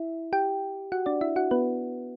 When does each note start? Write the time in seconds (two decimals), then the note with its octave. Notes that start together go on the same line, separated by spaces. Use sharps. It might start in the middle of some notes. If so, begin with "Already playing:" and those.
Already playing: E4 E5
0.33 G4 G5
0.92 F#4 F#5
1.06 D4 D5
1.21 E4 E5
1.36 F#4 F#5
1.51 B3 B4